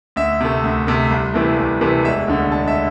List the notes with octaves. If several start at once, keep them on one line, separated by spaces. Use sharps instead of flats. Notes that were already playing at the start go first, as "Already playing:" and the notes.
D2 E5
C3 A3
D2
C3 A3
C2
C3 E3 A3
C2
C3 E3 A3
E1 E5
D2 D3
E1 A5
E5